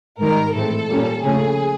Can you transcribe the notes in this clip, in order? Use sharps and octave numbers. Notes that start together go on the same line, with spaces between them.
G#2 D#3 G3 A#4
A2 E3 G#3 C4 A4
A#2 G3 A#3 C#4
C#3 F3 A3 C#4 G#4